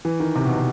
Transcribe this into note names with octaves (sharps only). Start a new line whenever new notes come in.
E3
D#3
C3
B2
C3